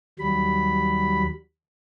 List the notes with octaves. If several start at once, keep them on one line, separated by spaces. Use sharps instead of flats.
D#2 F#3 G3 B5